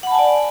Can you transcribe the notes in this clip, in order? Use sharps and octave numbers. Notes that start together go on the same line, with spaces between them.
D5 F#5 G#5 A5 B5